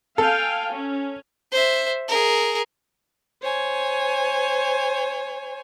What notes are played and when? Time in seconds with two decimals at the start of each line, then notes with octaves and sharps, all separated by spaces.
0.18 A4 F5 G5 G#5
0.73 C#4
1.52 C5 E5
2.08 G#4 A#4
3.42 C5 C#5 G#5